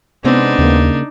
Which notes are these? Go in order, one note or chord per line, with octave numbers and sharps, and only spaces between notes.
C3 G#3 B3 C4 D4 D#4
D#2 C#3 A#3